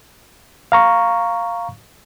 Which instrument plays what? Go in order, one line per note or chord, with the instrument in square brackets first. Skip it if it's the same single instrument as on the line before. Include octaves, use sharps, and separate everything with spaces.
[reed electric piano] F5 A#5 C#6